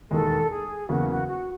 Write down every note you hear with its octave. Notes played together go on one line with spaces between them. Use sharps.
E1 D#2 D#3 G#3 A4
G#4
E2 C#3 F#3 A#3 F#4
F#4
F#4